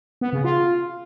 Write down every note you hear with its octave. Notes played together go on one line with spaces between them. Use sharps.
B3
C#3
F4